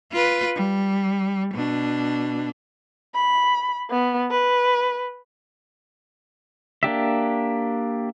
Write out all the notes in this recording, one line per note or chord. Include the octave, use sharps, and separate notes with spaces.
F4 B4
G3
B2 D4
B5
B3
B4
A#3 D4 G4 E5